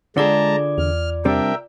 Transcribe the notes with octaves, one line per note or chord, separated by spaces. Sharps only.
D3 G#3 F4 G#4 D5 A5 A#5 D6
E2 F6
C3 G3 D4 A#4 E5 G5